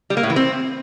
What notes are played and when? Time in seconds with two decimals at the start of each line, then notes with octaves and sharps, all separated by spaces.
0.10 G3
0.17 A#3
0.23 A2
0.30 E3
0.36 C4